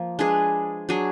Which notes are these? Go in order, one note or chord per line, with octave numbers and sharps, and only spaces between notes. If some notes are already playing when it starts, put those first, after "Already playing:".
Already playing: F3 A#3
G#3 D4 G#4 B4
F#3 D4 G#4